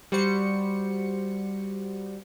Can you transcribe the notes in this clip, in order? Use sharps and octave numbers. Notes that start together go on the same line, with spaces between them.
G3 F#4 C5 C#7